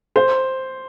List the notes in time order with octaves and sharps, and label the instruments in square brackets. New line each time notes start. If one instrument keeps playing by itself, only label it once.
[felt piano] C5